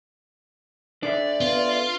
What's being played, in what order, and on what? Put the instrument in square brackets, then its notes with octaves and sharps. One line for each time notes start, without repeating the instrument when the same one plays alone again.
[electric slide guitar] D4 A4 E5 [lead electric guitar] D5
[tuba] B3 [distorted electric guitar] F4